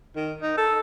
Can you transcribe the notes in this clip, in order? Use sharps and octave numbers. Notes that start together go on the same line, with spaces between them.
D#3
D#4
A4